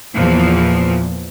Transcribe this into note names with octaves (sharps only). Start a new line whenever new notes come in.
E2 A#2 E3 F3